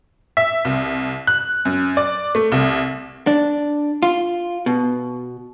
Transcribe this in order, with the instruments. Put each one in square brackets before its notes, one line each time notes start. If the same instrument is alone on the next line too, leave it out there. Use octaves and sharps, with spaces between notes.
[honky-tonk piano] E5
C2
F#6
F#2
D5
A3
C2
[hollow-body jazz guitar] D4
F4
B2